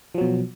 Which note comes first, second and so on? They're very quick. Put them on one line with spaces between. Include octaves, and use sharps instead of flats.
F3 F#3 B2